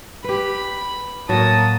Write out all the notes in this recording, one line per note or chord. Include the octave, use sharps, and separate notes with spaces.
G4 B4 B5
A2 F#3 A#3 F#4 A5 D#6